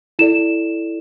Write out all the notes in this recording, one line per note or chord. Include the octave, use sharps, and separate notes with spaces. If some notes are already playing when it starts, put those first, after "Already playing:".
E4 A4 D5 E7